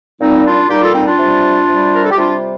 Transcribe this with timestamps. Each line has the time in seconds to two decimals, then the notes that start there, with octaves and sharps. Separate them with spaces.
0.20 A#2 G3 C4 D#4
0.44 D4 F4
0.69 A#2 G3 D#4 G4
0.81 F4 A4
0.94 C4 D#4
1.06 D4 F4
1.18 C3 G3
1.69 C3 G3
1.95 A#4
2.02 A4
2.11 G4
2.17 C3 G3 D4 F4